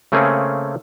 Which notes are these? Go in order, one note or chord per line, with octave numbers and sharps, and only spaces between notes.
C#3 A3 A#3 C4 C#4 G#4